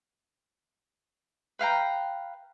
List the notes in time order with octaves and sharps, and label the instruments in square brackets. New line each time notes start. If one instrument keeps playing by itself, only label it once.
[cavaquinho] B4 F5 G5 A#5